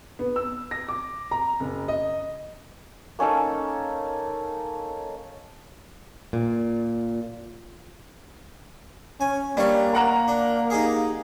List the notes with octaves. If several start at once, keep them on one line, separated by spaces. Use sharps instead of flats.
B3
E6
A#6
D6
A#5
F#1
D#5
A#3 C#4 D#4 A4
A#2
C#4 G#5
G3 A#3 D4 C#5
A#4 F#5 A#5
D4
D#4 G4 G#4